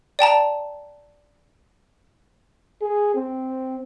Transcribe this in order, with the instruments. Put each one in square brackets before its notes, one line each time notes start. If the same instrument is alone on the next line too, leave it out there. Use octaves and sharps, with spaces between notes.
[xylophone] D5 G5 A5 A#5
[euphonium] G#4
C4